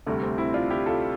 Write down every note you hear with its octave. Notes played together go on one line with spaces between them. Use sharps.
D2 C3 G3 A3
A3 C4
C4 E4
D4 F4
E4 G4
F4 A4